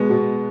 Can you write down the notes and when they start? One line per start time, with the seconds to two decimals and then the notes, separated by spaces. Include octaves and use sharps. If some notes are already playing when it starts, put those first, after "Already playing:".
Already playing: B2 G#3 B3 G#4
0.10 B2 F#4